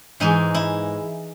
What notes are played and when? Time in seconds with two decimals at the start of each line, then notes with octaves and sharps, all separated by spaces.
0.20 G#2 E3 G#3 D#4
0.54 E4